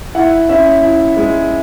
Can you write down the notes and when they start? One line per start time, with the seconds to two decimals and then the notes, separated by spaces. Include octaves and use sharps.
0.15 E4 F#5
0.49 C#4 E5
0.84 E4
1.17 G#3